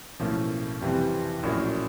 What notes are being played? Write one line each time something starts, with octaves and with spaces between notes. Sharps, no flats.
B1 A2 F3 A#3 C#4
F2 C3 E3 G3 C4
A#1 A2 F#3 A#3 C#4